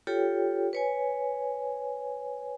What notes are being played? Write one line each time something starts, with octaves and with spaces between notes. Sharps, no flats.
F4 G4 A4 C#5 G5
B4 C#5 G#5